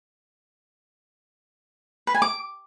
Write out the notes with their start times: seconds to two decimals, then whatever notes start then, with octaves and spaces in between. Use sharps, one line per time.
2.07 B4
2.14 G#5
2.22 D6